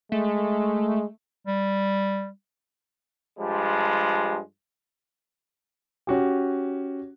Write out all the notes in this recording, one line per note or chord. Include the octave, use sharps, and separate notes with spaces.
G#3 A3
G3
G2 F3 G3 G#3
C#4 F#4 G4